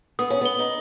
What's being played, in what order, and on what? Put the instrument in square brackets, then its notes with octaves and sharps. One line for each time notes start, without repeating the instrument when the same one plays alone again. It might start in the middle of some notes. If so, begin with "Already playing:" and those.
[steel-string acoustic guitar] B3 [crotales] D#6
[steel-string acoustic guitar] C#4
[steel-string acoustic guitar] B3 [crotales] G7
[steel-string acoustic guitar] D#4